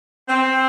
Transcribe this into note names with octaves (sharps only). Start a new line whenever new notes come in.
C4